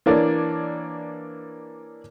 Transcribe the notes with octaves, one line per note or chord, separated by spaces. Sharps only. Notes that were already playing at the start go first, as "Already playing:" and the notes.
E3 A#3 D4 C#5 D5